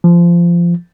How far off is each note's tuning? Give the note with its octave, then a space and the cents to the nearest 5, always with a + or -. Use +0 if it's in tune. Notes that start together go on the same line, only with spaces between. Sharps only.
F3 -20